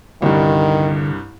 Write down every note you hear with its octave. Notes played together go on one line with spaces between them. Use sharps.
C2 G2 D3 D#3